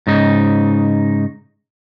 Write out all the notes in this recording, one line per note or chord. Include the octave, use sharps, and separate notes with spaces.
G#2 C#3 D#4